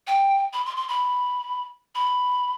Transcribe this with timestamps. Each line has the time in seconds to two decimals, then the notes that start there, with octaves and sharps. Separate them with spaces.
0.07 G5
0.53 B5
0.66 C6
0.77 C6
0.88 B5
1.95 B5